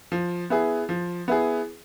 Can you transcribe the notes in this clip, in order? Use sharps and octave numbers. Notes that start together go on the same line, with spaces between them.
F3
B3 E4 G#4
F3
B3 E4 G#4